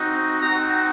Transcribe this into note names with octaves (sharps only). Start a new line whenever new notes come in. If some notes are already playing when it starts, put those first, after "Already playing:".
Already playing: C4 D#4 F#4
C4 D#4 F#4 A#5